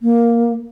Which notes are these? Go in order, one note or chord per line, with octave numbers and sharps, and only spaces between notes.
A#3